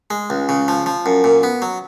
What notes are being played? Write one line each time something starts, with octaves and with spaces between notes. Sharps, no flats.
G#3
C#2
C#3
F3
F3
F#2
A#2
B3
F#3